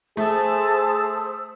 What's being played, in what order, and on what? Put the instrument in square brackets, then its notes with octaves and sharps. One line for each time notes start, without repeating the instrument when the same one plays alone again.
[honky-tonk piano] A3 [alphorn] G#4 [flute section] C5 D#6 E6 [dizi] A5